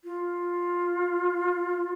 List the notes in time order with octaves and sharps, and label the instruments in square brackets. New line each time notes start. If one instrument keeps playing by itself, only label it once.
[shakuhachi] F4